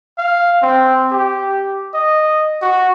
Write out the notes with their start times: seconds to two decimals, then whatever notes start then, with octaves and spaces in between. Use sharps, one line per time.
0.18 F5
0.62 C4
1.11 G4
1.94 D#5
2.62 F#4